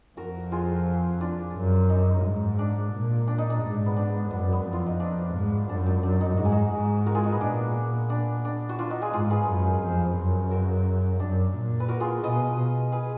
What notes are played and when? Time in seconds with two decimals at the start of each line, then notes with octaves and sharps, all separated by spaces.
0.17 F2 F#4 A#4
0.52 F4 G#4
1.21 D4 F4
1.55 F#2
1.89 D#4
2.24 G#2
2.59 D4
2.93 A#2
3.27 D4
3.38 D#4
3.50 D4
3.62 G#2
3.86 B3
3.97 D4
4.31 F#2 B3
4.52 B3
4.65 F2
4.73 F4
4.86 D#4
5.00 D4
5.35 G#2
5.69 F#2 D4
5.86 D4
6.03 D4
6.21 D#4
6.37 G#2 F#4
6.45 G#4
6.52 D#4 F#4
6.72 G#2
7.06 F#4 A#4
7.15 F4 G#4
7.24 D#4 F#4
7.32 B3
7.41 A#2 D4
8.10 D4
8.45 D4
8.69 F#4
8.79 D4 F4
8.90 D#4 F#4
9.02 F4 G#4
9.13 G#2 F4 G#4
9.30 G#4 B4
9.48 F#2
9.82 F2
10.16 F#2
10.51 F#4 A#4
11.19 F#2 D4
11.55 A#2
11.80 B4
11.88 F#4 A#4
12.00 F4 G#4
12.23 B2 B4 D#5
12.92 G#4 B4